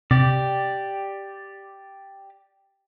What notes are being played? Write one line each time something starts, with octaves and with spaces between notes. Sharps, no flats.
C3 G4 D5